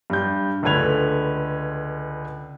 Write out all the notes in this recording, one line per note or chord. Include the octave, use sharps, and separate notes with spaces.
G2 G6
C#2 D3 A3 B4 G#6 F7